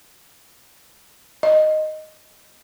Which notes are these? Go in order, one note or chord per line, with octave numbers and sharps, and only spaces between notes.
D#5